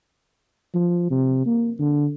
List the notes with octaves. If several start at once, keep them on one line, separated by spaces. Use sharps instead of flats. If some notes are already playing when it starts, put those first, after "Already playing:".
F3
C3
A#3
D3